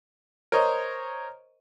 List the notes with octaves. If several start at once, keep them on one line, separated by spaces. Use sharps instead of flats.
A#4 C5 C#5 D#5